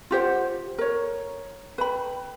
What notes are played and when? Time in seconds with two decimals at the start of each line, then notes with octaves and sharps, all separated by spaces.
0.11 F4 G4 C5 F#5
0.78 A#4 C#5
1.78 B4 G5 B5